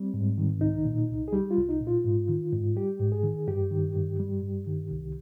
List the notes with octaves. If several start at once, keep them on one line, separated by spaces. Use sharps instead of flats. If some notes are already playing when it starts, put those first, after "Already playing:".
Already playing: G3 C4
G#2
D#3
C2 D#4
A#2
C2
G#4
G3 G4
F4
C2
D#4
A#2
F4
G#2
D#3
G#2
G3 G4
G#2
G#4
D#3
G2 G4
D#3
G2
G3
G2
D#3
C2